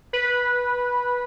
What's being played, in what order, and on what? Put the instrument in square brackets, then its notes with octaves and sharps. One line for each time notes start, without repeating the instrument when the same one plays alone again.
[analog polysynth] B4